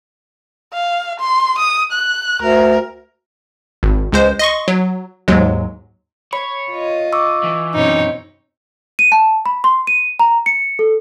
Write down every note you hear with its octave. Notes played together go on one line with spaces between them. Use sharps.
F5
C6
D#6
F#6
D2 A#4
G#1
C#2 G#3 C5
D#5 C6 C#6
F#3
D#2 G#2 F#3 G#3
C#5 B5
F4 D#5
C#6 D6 E6
E3
F#2 B2 C4 D#4 C#5
D#7
A5
B5
C6
D#7
A#5
C#7
A4